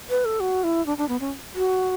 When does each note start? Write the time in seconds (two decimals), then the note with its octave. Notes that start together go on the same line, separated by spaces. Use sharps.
0.10 B4
0.25 A4
0.40 F#4
0.64 E4
0.86 D4
0.98 D4
1.09 B3
1.20 C#4
1.55 F#4